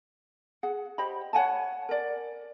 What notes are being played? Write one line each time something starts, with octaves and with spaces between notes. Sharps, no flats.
G#4 F#5
G4 C5 D#5 B5
C#5 F#5 G#5 A5
A#4 D5